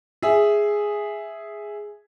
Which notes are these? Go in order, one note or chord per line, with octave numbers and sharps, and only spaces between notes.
G#4 E5